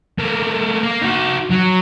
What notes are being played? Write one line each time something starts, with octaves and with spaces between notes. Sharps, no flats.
A3 A#3
A#3
D#4 F#4
F#3